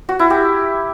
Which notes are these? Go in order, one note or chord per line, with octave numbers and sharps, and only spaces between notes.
F#4
E4
G4